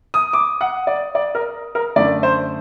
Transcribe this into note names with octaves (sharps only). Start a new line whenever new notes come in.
D#6
D6
F#5
D5
D5
A#4
A#4
F#2 D3 A3 D5
C5